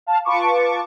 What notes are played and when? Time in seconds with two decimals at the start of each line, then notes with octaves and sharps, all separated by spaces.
0.07 F5 A5
0.25 F4 B4 A5 C#6 D6